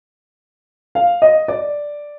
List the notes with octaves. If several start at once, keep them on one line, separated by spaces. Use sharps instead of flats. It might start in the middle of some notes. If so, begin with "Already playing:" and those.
F5
D#5
D5